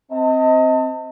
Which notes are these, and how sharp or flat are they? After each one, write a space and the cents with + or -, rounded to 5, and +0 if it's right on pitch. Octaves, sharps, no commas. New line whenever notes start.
C4 +0 D#5 +25 A5 +35